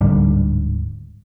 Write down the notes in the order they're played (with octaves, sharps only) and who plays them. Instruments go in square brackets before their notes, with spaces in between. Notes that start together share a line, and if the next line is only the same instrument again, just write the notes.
[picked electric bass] D1 G#2 D3 G3